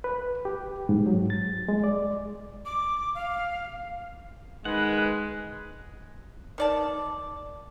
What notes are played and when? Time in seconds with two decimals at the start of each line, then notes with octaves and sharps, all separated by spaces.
0.04 B4
0.45 G4
0.89 G#2
1.06 F#3
1.30 A6
1.68 G#3
1.84 D5
2.65 D6
3.15 F5
4.65 D#3 G#3 B4 F#5
6.58 D#3 D5 A5